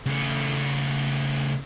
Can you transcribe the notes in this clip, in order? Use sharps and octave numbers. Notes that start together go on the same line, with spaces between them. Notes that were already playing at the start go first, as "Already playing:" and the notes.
C#3 A3